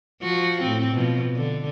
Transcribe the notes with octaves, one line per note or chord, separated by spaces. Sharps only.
F3 F#4
A2 C4
B2 F3
D3